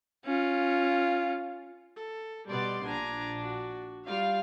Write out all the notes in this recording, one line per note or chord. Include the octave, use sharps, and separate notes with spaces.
C#4 F4
A4
B2 G3 B3 D5 C6
A#1 D4 G#5 A#5
F#4
G3 F4 F5